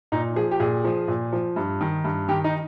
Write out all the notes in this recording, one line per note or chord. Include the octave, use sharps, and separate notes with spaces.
A#2 D#4
F3 G#4
G4
A#2 G#4
F3
A#2
F3
G2
D#3
G2
D#3 G4
D#4